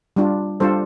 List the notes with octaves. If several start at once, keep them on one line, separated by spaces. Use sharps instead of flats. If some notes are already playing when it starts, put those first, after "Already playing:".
G3 D4 F4
G3 D4 F4 A4 C5